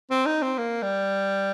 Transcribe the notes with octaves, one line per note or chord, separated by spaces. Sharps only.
C4
D#4
C4
A#3
G3